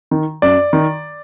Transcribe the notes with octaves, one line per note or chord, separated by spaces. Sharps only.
D#3
F#2 D5
D#3